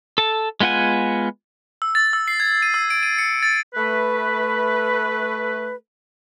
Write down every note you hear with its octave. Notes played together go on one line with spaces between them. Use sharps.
A4 A5
G#3 B3 F4 F#5 G#5
E6
A6
E6
C7
G#6
D#7
E6
D7
D#7
C#7
A6
A3 B4